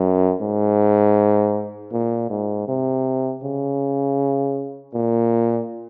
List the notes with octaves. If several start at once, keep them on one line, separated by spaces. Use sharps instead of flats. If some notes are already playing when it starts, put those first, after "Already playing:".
Already playing: F#2
G#2
A#2
G#2
C3
C#3
A#2